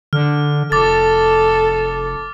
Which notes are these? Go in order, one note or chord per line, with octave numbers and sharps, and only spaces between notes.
D3 F6
F1 A4 D6 A6